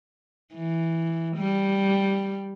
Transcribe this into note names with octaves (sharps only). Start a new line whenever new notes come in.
E3
G3